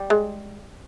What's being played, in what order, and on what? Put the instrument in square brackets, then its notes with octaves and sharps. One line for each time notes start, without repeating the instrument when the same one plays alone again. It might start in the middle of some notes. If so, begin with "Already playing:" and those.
Already playing: [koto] G3
[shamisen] G#3